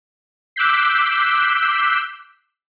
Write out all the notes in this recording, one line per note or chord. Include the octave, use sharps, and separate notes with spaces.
D6 E6 F#6 G6 B6 C7